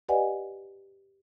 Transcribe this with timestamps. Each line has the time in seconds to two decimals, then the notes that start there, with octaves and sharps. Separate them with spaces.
0.09 G4 B4 D5 D#5 F#5 G#5